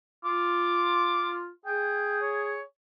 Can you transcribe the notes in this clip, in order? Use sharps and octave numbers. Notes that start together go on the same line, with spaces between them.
F4 D6
G#4 G5
C#5